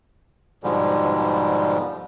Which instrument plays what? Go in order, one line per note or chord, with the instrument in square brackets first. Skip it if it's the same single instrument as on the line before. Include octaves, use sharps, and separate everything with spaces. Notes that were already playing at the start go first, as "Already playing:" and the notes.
[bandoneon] G#2 B2 D3 F3 G3 G#3